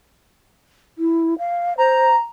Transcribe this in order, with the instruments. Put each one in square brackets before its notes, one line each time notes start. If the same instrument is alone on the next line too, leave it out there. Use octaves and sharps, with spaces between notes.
[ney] E4
F5
[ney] C5 [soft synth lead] A#5